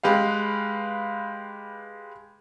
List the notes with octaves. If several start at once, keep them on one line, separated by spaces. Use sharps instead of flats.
G#3 G4 B4 F5